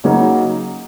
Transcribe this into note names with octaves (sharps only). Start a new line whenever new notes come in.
C#3 F#3 A#3 D#4